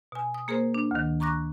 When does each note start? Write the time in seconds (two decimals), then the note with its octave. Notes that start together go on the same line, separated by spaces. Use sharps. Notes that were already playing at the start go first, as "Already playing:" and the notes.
0.12 B2 G#5
0.34 D#6
0.48 A#3 G#4 A#4 C5
0.74 D4
0.91 D2 D#3
1.20 A#5 C#6 D6 F#6 A#6